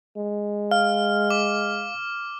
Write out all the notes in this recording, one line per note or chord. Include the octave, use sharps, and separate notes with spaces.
G#3
F5 F6
D6